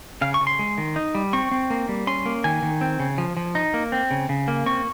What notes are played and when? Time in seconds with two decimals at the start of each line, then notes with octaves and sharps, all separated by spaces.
0.21 C#3 F5
0.34 C#6
0.41 C#3
0.47 C6
0.59 G#3
0.78 D#3
0.96 D#4
1.15 G3
1.33 C4 C#6
1.51 C4
1.70 A#3
1.89 G3
2.07 C#4 C6
2.26 A#3
2.44 D#3 G#5
2.63 D#3
2.81 C4
3.00 C#3
3.18 F3
3.37 F3
3.55 D#4
3.74 A#3
3.92 C4
4.11 C#3
4.29 C#3
4.48 A#3
4.66 C4 C#6